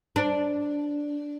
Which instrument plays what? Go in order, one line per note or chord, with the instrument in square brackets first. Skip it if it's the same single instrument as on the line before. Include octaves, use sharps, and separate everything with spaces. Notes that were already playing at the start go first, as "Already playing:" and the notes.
[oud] D4